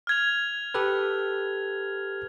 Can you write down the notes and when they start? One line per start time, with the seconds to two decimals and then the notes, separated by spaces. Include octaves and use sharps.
0.07 F6 G#6 F7
0.74 G4 A4 B4